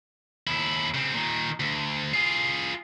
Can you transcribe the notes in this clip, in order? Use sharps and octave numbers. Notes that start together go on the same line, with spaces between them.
D#2 E4
C#3 C4
A#2 D#3
D2
F4 G#4